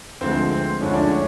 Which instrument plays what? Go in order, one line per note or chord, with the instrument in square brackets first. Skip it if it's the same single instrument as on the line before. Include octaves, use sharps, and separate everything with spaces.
[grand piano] D2 D3 F3 G#3 C4
C4
D2 D3 F3 G#3 C#4
D4
C#4